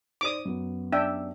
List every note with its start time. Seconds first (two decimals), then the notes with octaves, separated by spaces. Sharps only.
0.21 D#4 C5 D5 D6 D#6
0.45 F#2 B3
0.92 D4 E5 G5